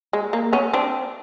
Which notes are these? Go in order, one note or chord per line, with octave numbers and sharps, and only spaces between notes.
G#3
A#3
B3 C#4
C4 D4